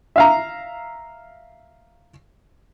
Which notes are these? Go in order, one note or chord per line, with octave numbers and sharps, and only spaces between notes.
E5 F5 A#5